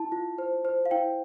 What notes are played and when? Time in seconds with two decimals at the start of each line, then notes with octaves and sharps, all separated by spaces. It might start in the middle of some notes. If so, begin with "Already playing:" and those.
Already playing: E4 A5
0.12 F4
0.38 C5
0.65 C5
0.86 F5
0.91 E4 G5